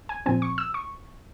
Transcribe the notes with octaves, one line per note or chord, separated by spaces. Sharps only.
G#5
A#2 F3 C4 G#5
C#6
E6
C#6